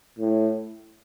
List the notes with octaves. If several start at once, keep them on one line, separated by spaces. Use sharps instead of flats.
A2